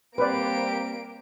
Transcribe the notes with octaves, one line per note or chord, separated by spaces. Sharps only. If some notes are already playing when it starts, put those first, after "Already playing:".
G3 A#3 C4 G4 B4 C5 D5 D7